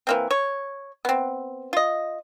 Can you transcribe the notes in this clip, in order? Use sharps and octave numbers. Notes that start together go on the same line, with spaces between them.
E3 A#3 C4
C#5
B3 C4
F4 D#5